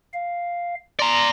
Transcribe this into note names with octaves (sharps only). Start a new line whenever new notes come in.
F5
D5 A#5 C6 A#6